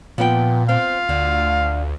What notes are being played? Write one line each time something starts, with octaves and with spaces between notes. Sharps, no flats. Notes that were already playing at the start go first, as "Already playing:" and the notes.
A#2 F3 B3 G5
C4 F4 F5
D2 D3